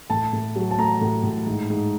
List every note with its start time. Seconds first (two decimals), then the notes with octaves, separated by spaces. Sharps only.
0.10 A2 A5
0.33 A2
0.56 F#3
0.71 A5
0.78 A3 A#5
1.01 A2
1.23 A2
1.47 G#2
1.70 G#2